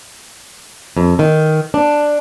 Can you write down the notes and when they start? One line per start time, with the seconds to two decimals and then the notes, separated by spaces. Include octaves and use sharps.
0.97 F2
1.19 D#3
1.74 D4